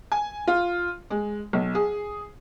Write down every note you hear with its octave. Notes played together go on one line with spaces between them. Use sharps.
G#5
F4
G#3
B1
G#4